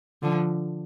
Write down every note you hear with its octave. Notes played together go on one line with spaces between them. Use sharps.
D3 F3